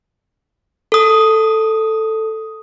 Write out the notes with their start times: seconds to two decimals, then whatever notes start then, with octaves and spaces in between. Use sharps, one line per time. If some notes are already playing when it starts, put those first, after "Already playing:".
0.92 A4 D#6